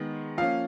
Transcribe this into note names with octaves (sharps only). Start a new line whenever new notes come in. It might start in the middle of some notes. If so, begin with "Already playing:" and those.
Already playing: D#3 G#3 B3
F3 A#3 C#4 F5